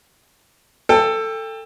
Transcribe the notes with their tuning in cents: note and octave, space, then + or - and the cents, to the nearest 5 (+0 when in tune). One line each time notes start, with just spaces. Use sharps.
A4 +15 G5 +30